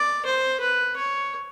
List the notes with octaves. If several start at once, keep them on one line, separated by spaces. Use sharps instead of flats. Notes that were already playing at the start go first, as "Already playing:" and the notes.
Already playing: D5
C5
B4
C#5